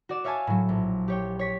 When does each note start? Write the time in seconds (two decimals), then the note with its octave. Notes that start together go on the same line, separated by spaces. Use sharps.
0.09 F#4 D5 E7
0.24 C#5 E5 F5 G#5 A5
0.47 A2 F#3
0.69 A#1
1.08 G4 C#5 G5
1.39 C#5 B6